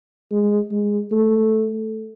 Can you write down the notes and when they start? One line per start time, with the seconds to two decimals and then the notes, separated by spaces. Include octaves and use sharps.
0.32 G#3
0.71 G#3
1.11 A3